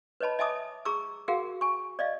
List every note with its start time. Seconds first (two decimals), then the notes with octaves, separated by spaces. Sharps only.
0.20 B4 C#5 D#5 A5 B5
0.39 D#5 E5 G#5 A5 D6 D#6
0.85 G#4 A#5 C#6 D6 E6
1.28 F#4 G#4 A#4 F5 F#5
1.61 G#5 C#6
1.99 D5 D#5 F5